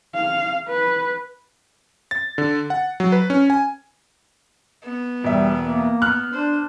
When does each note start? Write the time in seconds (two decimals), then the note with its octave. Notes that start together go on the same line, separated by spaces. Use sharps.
0.15 F5
0.69 B4
2.11 A6
2.38 D3
2.70 F#5
3.00 F#3
3.12 B4
3.30 C#4
3.50 G#5
4.84 B3
5.24 E1 G3 E5
5.61 A#3
6.02 B3 F6 F#6
6.33 D4 C5